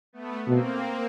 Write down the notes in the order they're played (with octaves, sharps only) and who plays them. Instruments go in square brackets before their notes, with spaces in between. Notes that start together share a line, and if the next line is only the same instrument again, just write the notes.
[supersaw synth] A3 B3
[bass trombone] B2 [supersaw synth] A#3 C4